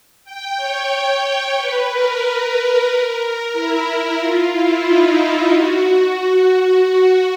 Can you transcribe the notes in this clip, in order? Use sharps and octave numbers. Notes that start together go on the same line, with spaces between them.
G5
C#5
B4
A#4
E4
F4
E4
D#4
E4
F#4
F#4